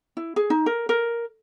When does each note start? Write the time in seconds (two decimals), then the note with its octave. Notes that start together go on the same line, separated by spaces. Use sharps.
0.17 E4
0.36 G#4
0.50 D#4
0.66 A#4
0.89 A#4